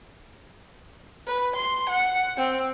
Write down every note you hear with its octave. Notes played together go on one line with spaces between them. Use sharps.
B4
C6
F#5
C4